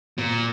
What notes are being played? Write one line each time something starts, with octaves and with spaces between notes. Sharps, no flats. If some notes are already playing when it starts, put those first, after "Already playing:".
A#2